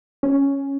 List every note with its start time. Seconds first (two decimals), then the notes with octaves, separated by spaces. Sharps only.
0.23 C#4